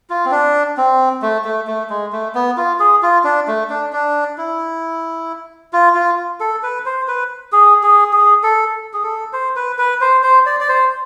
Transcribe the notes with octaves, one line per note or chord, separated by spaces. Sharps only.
F4
C4
D4
C4
A3
A3
A3
G#3
A3
B3
F4
G#4
F4
D4
A3
D4
D4
E4
F4
F4
A4
B4
C5
B4
G#4
G#4
G#4
A4
G#4
A4
C5
B4
B4
C5
C5
D5
D5
C5